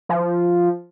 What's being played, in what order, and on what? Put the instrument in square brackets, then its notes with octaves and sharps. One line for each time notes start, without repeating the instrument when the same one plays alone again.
[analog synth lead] F3